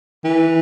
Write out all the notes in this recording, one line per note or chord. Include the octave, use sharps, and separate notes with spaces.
E3